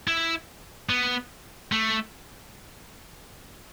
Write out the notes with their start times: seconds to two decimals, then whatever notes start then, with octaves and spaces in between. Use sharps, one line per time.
0.08 E4
0.89 B3
1.72 A3